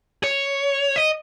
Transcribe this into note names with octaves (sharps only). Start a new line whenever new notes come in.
C#5
D#5